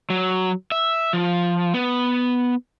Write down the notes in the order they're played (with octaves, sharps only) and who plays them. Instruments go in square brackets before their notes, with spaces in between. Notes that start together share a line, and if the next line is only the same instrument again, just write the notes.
[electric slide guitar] F#3
E5
F3
B3